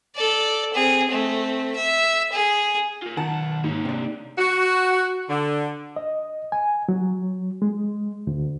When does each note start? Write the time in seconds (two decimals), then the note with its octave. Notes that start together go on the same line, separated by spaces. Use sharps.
0.16 A4 D5
0.74 C4 G#4
1.08 A3 C4
1.75 E5
2.32 G#4
3.02 F4 A#4
3.17 B1 D#3 F#5 A5
3.64 G#2 A#3 C#5
3.85 C3 D4
4.38 F#4
5.29 D3
5.96 D#5
6.52 G#5
6.89 F#3
7.62 G#3
8.27 D2